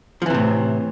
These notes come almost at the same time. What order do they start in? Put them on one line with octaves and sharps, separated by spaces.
F3 E3 C3 A2